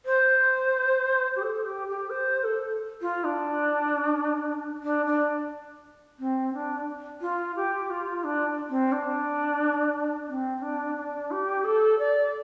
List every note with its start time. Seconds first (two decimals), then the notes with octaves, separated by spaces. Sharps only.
0.06 C5
1.36 G4
1.42 A4
1.65 G4
1.87 G4
2.10 C5
2.44 A4
3.02 F4
3.24 D4
4.83 D4
5.06 D4
6.19 C4
6.53 D4
7.21 F4
7.56 G4
7.90 F4
8.24 D4
8.70 C4
8.92 D4
10.29 C4
10.62 D4
10.97 D4
11.31 G4
11.64 A4
11.99 D5